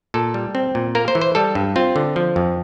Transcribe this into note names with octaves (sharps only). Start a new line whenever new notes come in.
A#2 A4
G3
C4
A#2
A#3 A#4
C5
E3
C5
G3 A4
G2
C4 F4
D3
F3
F2